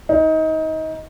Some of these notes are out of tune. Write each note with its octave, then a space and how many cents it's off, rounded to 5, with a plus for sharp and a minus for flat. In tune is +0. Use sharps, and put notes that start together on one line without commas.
D#4 +25